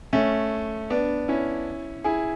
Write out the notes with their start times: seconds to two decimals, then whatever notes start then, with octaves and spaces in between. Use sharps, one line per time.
0.13 A3 C#4
0.90 B3 D4
1.28 C#4 E4
2.04 E4 G#4